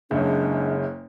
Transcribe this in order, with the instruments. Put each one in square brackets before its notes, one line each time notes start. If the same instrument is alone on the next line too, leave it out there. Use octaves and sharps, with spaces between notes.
[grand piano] F#1 F#2 [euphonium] G#3 [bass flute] D4